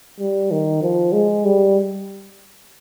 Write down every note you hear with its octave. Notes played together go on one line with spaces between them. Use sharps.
G3
D#3
F3
G#3
G3